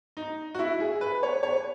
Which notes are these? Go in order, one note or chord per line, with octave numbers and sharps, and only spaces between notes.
D#4
F#4
E4
G#4
B4
C#5
C#5